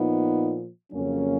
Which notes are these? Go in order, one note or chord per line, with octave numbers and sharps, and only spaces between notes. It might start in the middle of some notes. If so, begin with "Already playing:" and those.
Already playing: A#2 F3 B3 D#4
F2 C#3 F#3 A#3 C#4